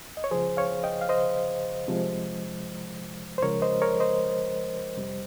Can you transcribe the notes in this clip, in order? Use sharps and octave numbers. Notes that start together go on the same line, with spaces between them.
D#5
C#5
C#2 C#3 F3 G#4 C5
C#5 F5
D#5 G5
F5
C5 D#5
C2 C3 F3 G#3
C5
C#2 C#3 F3 G#3 A#4 C#5
C5 D#5
A#4 C#5
C5 D#5
F2 C3 G3